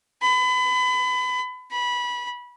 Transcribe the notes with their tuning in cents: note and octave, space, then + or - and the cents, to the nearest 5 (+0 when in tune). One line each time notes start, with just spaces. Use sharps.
B5 +30
B5 -20